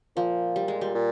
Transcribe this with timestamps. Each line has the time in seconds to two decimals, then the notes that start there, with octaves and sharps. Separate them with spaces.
0.17 A#2 F3
0.56 G3
0.68 G#3
0.81 G3
0.95 A#2